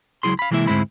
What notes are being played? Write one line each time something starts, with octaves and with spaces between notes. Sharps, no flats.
C#2 F#3 E4 G#4 C6
F5 B5
C3 E3 G#3 A#3 E4 E5
D2 G#2 G#3 C4 E4 B5